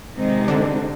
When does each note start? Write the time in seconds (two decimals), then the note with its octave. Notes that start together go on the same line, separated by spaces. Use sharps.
0.16 C3 D#3 G#3 C4 D#4
0.48 D3 D4